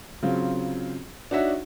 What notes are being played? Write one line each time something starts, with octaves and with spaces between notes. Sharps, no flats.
C#3 F#3 C4 F4
D4 D#4 F#4 C#5 E5 F#5